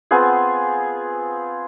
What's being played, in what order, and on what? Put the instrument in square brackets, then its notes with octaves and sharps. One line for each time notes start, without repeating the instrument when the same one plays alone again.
[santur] B3 C4 F4 G#4